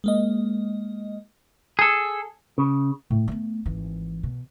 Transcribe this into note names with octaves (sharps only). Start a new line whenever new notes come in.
G#3 A#3 D#5
G#4 A4
C#3
A2
A3 B3
G#1 E3
B2